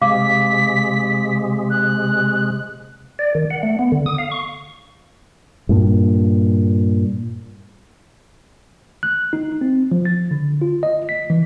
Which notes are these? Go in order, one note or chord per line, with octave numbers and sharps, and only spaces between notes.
C3 G#3 F5 D6 B6
F#6
D5
D#3
F#5
A3
B3
D3
D#6
F5
C#6
G2 A#2
F#6
D#4
C4
F3
A6
D3
F4
D#5
B6
E3